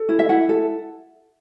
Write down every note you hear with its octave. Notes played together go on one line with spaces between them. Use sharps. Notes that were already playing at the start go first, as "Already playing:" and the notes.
Already playing: A4
E4
E5
E4 F#5
A4